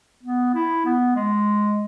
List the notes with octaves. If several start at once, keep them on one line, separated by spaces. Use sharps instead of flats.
B3
E4
B3
G#3